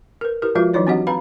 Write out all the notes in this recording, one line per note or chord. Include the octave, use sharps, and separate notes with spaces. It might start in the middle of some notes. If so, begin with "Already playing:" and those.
A#4 B4
E4 G4 A#4 B4
F3 G#3 F4 F#4 B4 E5
E3 F#3 D#4 E4 C#5 D5
C4 D4 F#4 G4 D#5 F#5
C4 B4 F5 A#5 B5